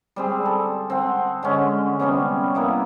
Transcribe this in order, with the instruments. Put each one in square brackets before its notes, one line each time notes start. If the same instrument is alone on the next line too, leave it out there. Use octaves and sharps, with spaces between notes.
[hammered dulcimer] G3 C4 G#4
A4
C4 F#5
D3 G#3 C#4
C3 G3 B3 C#4
A#3 B3 E4